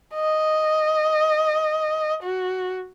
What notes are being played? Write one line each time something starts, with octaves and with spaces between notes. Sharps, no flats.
D#5
F#4